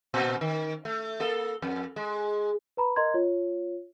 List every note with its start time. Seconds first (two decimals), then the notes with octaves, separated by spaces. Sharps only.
0.14 A#2
0.41 D#3
0.85 A3
1.20 A#3 A4
1.62 F2
1.96 G#3
2.77 B4 A#5 B5
2.96 A#4 D#5 A#5 C6 G#6
3.14 F4 C#5